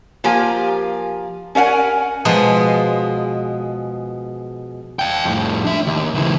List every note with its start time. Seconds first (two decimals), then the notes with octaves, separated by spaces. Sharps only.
0.24 F3 A#3 G4 A#4 G#5
1.55 C#4 A#4 F5 F#5 G#5
2.25 B2 F3 G#3
4.99 F5 G5
5.25 F2 A2
5.64 D4 E5
5.87 D#2
6.14 C#2 E3